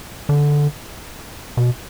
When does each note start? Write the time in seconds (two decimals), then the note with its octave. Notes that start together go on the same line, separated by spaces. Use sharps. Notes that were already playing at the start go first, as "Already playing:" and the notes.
0.29 D3
1.57 B2